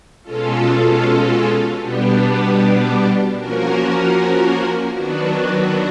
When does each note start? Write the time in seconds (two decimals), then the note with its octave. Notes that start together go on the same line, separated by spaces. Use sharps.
0.23 B2 G#3 C#4 F4 A4
1.79 B2 G3 B3 D4 G4
3.35 F3 A#3 C#4 F#4 A#4
4.92 D#3 F#3 B3 D4 F#4